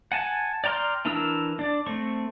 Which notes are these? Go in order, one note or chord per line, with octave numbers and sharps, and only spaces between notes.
F#5 G#5 A5
D5 G5 A#5 C6 F6
E3 D4 E4 A#4 E6
D4 D5
A3 C4 C#6